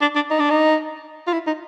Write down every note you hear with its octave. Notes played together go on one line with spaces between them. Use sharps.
D4
D4
D#4
D4
D#4
F4
E4
D#4